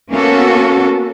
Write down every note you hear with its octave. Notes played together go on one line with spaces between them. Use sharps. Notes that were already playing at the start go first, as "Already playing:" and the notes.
A#3 B3 C#4 F#4 A4